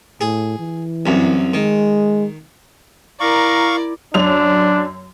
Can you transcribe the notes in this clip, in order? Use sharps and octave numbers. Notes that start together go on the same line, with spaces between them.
A2 G#4
E3
C2 F#2
D#3 G#3
E4 A#4 D5 F5 A#5 C#6
F#2 D4 F7